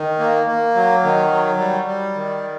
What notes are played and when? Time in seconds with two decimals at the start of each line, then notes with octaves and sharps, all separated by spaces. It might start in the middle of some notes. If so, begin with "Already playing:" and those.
Already playing: D#3
0.19 A#3
0.47 A#3
0.75 F#3
1.03 D#3
1.31 F#3
1.58 G3
1.86 G3
2.14 D#3